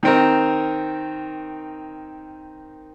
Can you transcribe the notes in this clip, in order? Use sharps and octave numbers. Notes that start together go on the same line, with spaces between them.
D#3 C4 A#4